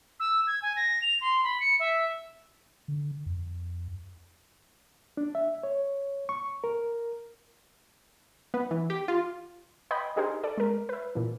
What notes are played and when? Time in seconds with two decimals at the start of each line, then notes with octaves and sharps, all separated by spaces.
0.20 E6
0.47 G#6
0.62 G#5
0.76 A#6
1.02 F7
1.21 C6
1.44 B5
1.60 C#7
1.80 E5
2.88 D3
3.26 F2
5.17 D4
5.35 E5
5.63 C#5
6.29 C#6
6.64 A#4
8.54 B3
8.71 E3
8.90 G4
9.08 F4
9.91 B4 D#5 G5 G#5 B5 C6
10.16 D4 D#4 G4 G#4 A#4 C5
10.44 A4 D5
10.58 G#3 A#4
10.89 B4 E5
11.15 A#2 E3